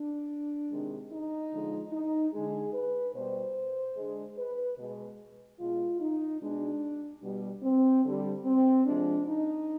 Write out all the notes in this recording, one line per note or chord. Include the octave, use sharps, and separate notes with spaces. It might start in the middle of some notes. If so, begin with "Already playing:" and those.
Already playing: D4
C3 D#3 G#3
D#4
D3 F3 G#3
D#4
D3 G#3 G#4
B4
B2 G3 C5
D3 G#3
B4
B2 G#3
B2 G#3 F4
D#4
B2 G#3 D4
B2 G3
C4
D3 G3
C4
C3 F3 G#3 D4
D#4